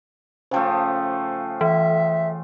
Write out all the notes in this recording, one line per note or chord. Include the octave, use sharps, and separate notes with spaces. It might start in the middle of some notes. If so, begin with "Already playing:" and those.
C#3 F3 A3 C5 G5
E3 E5